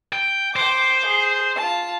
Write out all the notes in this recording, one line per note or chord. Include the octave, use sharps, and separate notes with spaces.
G5
C5 G5 D6
G#4
F4 A5